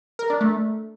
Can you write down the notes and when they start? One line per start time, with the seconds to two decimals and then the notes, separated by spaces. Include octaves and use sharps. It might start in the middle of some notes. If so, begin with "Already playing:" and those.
0.19 A#4
0.30 D4
0.41 A3